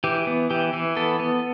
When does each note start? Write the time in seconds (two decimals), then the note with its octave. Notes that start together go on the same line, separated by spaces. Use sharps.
0.04 E3 G4
0.27 B3
0.50 E3 G4
0.73 E3
0.96 B3 A4
1.20 B3